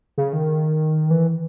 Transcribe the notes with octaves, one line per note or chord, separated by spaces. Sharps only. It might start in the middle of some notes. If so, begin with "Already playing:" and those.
C#3
D#3
E3